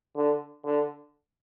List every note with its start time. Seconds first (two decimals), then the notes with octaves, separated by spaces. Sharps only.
0.16 D3
0.65 D3